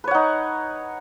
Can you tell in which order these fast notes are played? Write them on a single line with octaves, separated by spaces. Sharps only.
B4 C#5 F#5 D#4